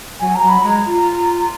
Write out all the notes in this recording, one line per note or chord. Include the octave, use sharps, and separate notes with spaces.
F#3 G#5
A#5
F#3
B5
G#3 A#5
F4